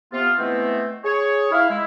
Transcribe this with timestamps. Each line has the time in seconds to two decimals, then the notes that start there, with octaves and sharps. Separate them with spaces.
0.12 C3 B3 F4
0.38 E3 G#3 A3 B3 C4
1.04 G#4 C#5
1.51 E4 F5
1.70 G#3 E4